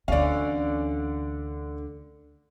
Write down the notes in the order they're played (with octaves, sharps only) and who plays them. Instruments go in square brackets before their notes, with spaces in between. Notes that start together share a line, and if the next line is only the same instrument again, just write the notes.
[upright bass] D2 E3 [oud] D3 C#4 [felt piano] D5 F5